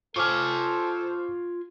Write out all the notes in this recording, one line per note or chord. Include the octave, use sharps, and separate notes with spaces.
F4 A4 C5 G#5 C#6 D6 F6